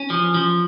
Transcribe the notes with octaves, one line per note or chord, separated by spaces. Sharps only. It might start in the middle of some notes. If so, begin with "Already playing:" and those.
Already playing: C#4
F3
F3